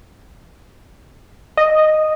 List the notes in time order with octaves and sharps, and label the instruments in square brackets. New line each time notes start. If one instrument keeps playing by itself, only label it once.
[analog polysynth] D#5